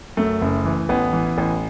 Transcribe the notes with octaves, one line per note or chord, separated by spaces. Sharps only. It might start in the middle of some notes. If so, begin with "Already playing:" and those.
F#2 A3
F#1
E3
A1 B3
E3
A1